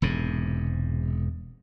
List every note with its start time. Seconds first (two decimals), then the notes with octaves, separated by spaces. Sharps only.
0.02 E1 G#2 C3